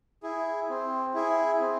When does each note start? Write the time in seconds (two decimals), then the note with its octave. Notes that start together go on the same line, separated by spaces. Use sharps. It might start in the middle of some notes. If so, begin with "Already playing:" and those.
0.23 E4 G#4
0.69 C4
1.14 E4 G#4
1.61 C4